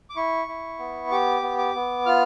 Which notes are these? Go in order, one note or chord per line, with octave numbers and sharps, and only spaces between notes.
D6
E4 C#6
E4
B3
G4 D6
B3
D6
B3
F4 F6